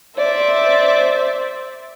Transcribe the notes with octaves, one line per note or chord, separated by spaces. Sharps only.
C5 D5 E5